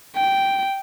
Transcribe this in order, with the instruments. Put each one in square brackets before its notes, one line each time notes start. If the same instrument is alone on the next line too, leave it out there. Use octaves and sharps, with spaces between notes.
[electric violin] G5